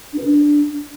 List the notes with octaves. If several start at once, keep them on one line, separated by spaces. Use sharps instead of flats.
D4
B4
D4